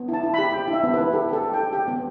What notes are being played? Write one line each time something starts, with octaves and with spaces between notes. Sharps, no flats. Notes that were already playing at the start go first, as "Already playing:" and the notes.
Already playing: B3
E4 A5
E4
G4 B5
G4 G5
E4
E5
B3
B4
E4
G4 A4
G4 A4
G4
G5
G4
G4 G5
B3